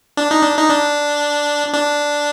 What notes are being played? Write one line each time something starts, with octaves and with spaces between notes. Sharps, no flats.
D4
D#4
D4
D#4
D4
D4